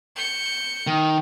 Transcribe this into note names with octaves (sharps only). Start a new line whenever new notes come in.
G6 C#7
D#3